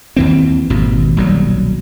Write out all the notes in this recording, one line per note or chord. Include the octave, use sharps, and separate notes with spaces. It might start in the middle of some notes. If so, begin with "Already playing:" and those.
D#2 E3 C4
G#1 D#2 B2
D#1 B1 F#3 G3